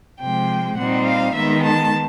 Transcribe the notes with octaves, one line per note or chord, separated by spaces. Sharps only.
C3 F3 G#3 G5
A#2 G3 C4 D#4 F#5
F5
D#3 G#3 B3 D#4 E5
A5